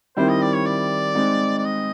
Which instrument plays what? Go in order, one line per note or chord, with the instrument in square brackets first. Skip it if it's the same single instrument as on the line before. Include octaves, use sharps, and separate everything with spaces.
[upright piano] D#3 G3 C4 E4 [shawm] C5
[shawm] D#5
D5
C#5
D5
[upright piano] G#3 C4 D#4
[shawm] D5
D#5